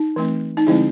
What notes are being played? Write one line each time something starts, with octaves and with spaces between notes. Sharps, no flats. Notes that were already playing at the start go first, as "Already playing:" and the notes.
Already playing: D#4
E3 A3 C4
D#4
D3 F3 G#3 C4 E4